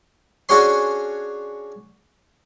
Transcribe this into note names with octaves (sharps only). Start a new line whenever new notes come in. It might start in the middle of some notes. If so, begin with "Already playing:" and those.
C#4 D4 F#4 G#4 C#5 C6